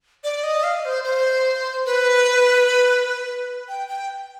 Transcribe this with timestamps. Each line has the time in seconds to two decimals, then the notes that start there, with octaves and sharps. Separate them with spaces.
0.24 D5
0.44 D#5
0.63 F5
0.85 C5
1.04 C5
1.86 B4
3.68 G5
3.88 G5